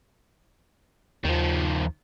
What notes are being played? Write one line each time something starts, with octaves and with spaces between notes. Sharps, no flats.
D#2 D#3 F3